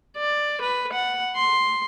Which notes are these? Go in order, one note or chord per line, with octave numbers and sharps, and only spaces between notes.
D5
B4
F#5
C6